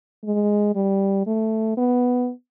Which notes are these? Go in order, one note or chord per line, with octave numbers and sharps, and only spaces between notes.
G#3
G3
A3
B3